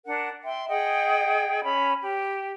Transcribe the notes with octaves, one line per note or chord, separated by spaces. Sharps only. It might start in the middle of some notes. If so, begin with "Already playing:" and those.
D4 A#4 F#5 F#6
E5 G5 C6
G#4 D#5 F#5 G5
C#4 B5
G4